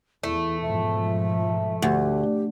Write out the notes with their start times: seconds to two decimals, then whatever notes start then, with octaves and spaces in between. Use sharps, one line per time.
0.23 E2 A3 E4
0.62 G#2 B2 F3 E5
1.82 D2 G4